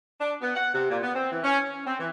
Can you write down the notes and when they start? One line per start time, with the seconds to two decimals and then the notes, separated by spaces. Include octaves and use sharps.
0.20 D4
0.41 B3
0.56 F#5
0.74 C3
0.90 A#2
1.02 B3
1.14 C4
1.31 E3
1.43 C#4
1.64 C#4
1.86 C4
1.99 E3